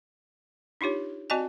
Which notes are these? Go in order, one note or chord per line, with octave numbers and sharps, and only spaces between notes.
D4 D#4 F4 G4 C#5
C4 F#4 D5 D#5 G#5 A5